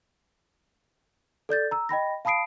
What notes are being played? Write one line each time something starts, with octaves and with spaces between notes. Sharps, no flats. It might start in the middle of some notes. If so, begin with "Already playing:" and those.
A4 D5 G6 A6
A#5 E6
D#5 G5 B5 A#6
F5 A5 B5 D#6 C7 D7